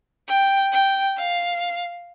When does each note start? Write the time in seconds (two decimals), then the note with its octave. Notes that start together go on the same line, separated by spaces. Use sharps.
0.28 G5
0.73 G5
1.18 F5